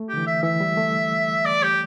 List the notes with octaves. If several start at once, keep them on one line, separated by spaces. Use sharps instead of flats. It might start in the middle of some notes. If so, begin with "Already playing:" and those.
Already playing: A3
D3 G4
E3
E5
E3 E5
G3
A3
D5
G4